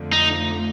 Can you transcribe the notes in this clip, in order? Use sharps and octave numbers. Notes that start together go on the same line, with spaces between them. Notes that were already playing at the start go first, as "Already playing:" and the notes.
Already playing: F2 D3 A3
D#4